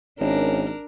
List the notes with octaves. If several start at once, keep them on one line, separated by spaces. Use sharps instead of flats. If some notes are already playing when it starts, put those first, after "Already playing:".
G#1 C#4 D4 A#4